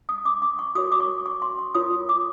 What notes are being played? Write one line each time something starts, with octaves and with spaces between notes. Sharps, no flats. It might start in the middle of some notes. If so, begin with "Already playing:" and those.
D#6
D6
D6
C#6
F#4 A#4 C#5 D#6
D6
C#6
C#6
C6
C#6
F4 A#4 C#5 D#6
D6